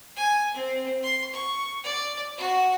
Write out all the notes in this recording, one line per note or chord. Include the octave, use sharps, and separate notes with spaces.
G#5
C4
C6
C#6
D5
F#4